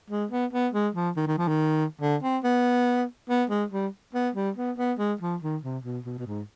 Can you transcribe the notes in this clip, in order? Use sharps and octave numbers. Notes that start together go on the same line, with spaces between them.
G#3
B3
B3
G#3
F3
D#3
D#3
F3
D#3
D3
C4
B3
B3
G#3
G3
B3
G3
B3
B3
G#3
F3
D#3
C3
B2
B2
B2
G#2